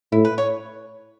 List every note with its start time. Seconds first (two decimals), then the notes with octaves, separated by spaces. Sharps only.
0.12 A2 E4
0.25 B4
0.38 C#5